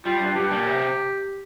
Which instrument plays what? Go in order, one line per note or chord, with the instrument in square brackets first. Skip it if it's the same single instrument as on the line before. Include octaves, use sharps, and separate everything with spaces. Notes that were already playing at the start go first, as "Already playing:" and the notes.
[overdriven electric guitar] G3 [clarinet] F4
[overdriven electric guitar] G2
[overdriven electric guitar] G2 [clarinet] G4
[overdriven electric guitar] A#2
C3